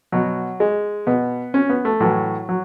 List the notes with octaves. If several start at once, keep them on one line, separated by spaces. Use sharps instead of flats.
B2 F#3
G#3
B2 B3
C#4
B3
A3
A2 E3 F#3
F#3